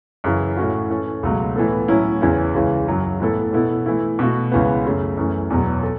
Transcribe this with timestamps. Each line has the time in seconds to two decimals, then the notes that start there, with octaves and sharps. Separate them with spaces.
0.24 F#2 C#3 E3
0.57 A2 A3 C#4 F#4
0.90 E3 C#4 A4
1.23 C#2 B2 F#3 A3
1.56 A2 E3 B3 A4
1.88 A2 F#3 C#4 E4
2.21 E2 C#3 E3 C#4 E4
2.54 C#2 C#3 E3
2.88 F#2 C#3 F#3
3.20 A2 E3 B3 E4 A4
3.53 B2 B3 E4 A4
3.86 E3 A3 E4
4.19 B2 A3 F#4
4.52 C#2 C#3 E3 B3
4.85 F#2 C#3 A3
5.17 F#2 E3 A3 C#4
5.50 E2 B2 F#3 B3
5.83 A4